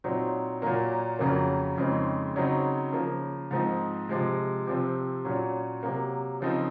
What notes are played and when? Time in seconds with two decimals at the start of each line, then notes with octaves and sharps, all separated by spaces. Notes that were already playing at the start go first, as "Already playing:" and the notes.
0.04 A#2 F#3 C4 D#4
0.62 A#2 F#3 A#3
1.19 F2 C#3 F#3 A#3
1.78 F2 C#3 G#3 C4 D#4
2.36 C#3 F#3 C4 D#4
2.93 C#3 F3 A#3
3.51 G#2 F3 C4 D#4
4.09 C3 F3 G#3
4.67 C3 F3 C4
5.25 A#2 F#3 C#4
5.83 C3 F#3 A#3
6.41 C#3 F3 C4 D#4